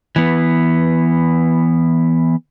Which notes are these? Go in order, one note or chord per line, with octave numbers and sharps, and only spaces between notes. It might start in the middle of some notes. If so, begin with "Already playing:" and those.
E3 B3